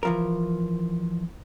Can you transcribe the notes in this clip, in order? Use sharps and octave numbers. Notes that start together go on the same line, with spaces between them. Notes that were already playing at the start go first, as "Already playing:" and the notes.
E3 F3 A#4